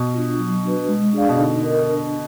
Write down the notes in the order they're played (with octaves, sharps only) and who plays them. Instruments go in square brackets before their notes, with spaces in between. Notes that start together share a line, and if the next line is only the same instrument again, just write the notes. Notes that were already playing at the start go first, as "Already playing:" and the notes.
Already playing: [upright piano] B2
[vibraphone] D4 F4
F#3
D4 F#4 B4
G#3
D4 G#4 D5 F5
[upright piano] B2
[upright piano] D3 [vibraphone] D#4
[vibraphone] A#4 D#5
D4